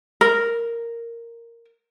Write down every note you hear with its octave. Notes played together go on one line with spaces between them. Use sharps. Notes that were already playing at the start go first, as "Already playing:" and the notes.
A#4